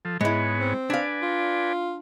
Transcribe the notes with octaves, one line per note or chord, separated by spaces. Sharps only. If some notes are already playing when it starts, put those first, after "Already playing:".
F3 A4
G#2 G#3 B3 E4 C#5
C4
D4 B4 D5 F5 G#5
F4